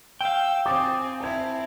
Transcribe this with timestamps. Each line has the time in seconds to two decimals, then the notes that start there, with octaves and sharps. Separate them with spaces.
0.21 F5 G5 E6
0.66 C4 G#5 D6 D#6 A6
1.20 C4 E4 A5 G#6